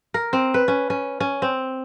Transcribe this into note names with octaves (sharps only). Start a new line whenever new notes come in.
A#4
C4
B4
C#4
C#4
C#4
C4